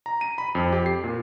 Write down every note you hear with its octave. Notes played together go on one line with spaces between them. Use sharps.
A#5
D#7
B5
F2
G4
C7
A#2